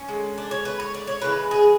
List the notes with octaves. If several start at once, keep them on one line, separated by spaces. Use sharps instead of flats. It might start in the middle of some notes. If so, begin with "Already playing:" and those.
Already playing: C#4
D3 G#3
D4
C#5
B4
C#5
D5
C#5
C#3 E3 G#3 B4
G#4